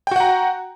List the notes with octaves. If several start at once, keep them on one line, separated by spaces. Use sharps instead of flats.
F#4 F#5 G5 A#5